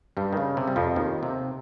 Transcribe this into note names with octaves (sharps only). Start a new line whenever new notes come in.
G2 G3
D#3
C#3
C3
G3
F2 F3
D#2 D#3
C3